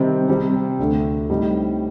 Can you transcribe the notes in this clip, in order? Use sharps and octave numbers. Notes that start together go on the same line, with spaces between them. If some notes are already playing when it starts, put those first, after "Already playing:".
Already playing: C3 D#3 G3 C4
C3 G3 C4
D2 D3 A3 D4
A2 G3 C4 D#4